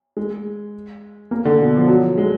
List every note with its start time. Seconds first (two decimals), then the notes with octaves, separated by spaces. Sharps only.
0.17 G#3
1.31 A#3
1.45 D3
1.60 B2
1.77 F3
1.88 F#3
2.18 G#3